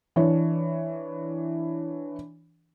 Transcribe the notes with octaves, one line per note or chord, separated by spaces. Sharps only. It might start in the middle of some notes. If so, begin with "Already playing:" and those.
E3 D4 C#5